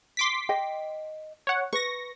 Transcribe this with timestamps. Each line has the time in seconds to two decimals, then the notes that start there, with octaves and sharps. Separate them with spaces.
0.17 C6 D6 B6
0.49 D#5 G5
1.47 C#5 F#5
1.73 B4 C#6 A#6